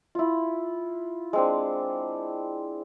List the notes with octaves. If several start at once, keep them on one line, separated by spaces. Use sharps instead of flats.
E4 F4
G#3 C4 D4